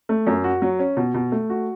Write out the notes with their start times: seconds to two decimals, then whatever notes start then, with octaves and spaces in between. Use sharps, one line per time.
0.09 A3
0.27 F#2
0.44 F#4
0.62 F#3
0.79 C#4
0.97 B2
1.14 B2
1.32 A3
1.50 F#4